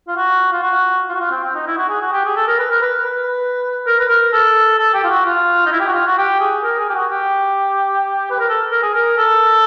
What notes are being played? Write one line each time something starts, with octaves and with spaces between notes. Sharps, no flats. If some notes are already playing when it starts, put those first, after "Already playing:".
F4
F#4
F4
F#4
F4
F#4
F4
C4
C4
D#4
E4
F#4
G#4
F#4
G4
G#4
A4
A#4
B4
A#4
B4
B4
A#4
B4
A#4
A4
A4
G4
F4
F#4
F4
D#4
E4
G4
F#4
F4
F#4
G4
G#4
A#4
G#4
G4
F#4
G4
B4
A#4
A4
A#4
G#4
A#4
A4